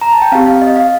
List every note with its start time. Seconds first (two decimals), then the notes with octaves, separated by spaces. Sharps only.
0.01 A#5
0.12 A5
0.22 G5
0.32 C4 G4 F5
0.46 F5
0.62 D#5
0.76 F5